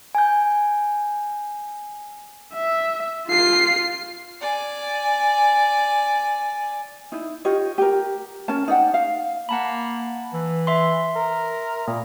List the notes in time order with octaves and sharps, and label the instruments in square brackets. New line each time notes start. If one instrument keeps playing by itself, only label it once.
[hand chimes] G#5 G6
[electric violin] E5
F4 C7
[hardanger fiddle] D5 G#5
[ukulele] D#4 E4
F4 G4 C#5 D#5
G4 A#4
C#4 A#4 A5
D#4 D5 F#5 G5
F5
[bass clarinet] A#3 [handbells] F#5 A5 B5
[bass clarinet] E3
[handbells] E5 C6
[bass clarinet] A#4
[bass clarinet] A#2 [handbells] A#3